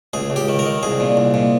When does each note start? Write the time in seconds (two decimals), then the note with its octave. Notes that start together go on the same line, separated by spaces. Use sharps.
0.13 C#2 G#4
0.30 C#2
0.36 G4
0.49 D#3
0.59 A#4
0.66 D#3
0.83 C2 G#4
1.00 A#2
1.17 C2
1.34 A#2